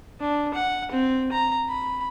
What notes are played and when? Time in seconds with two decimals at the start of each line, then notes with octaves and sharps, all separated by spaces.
0.20 D4
0.54 F#5
0.91 C4
1.32 A#5
1.68 B5